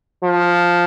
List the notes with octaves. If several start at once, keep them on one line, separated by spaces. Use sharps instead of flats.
F3